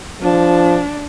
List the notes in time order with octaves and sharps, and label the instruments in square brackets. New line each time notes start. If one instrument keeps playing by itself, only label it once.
[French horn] F3 [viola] D4